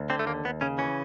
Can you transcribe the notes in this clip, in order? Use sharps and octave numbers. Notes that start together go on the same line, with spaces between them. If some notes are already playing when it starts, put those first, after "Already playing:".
Already playing: D2
D3 C4
A3
D#2 A#3
D#2 B3
C#3 C#4
E3 C#4